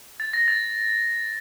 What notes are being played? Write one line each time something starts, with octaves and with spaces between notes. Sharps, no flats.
A6
A#6
A6